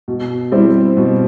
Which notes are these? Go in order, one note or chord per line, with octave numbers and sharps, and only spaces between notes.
B2
G3 C4 E4
B2